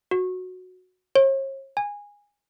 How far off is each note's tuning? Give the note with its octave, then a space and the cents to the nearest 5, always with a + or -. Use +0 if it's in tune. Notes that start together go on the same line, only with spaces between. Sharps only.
F#4 -10
C#5 -45
G#5 -15